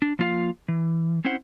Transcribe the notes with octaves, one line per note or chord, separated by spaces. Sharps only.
D4
F3 A#3 F4 D5 F5
E3
C4 C#4 E4 C5 F#5